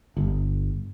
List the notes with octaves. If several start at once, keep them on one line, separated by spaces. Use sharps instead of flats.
G1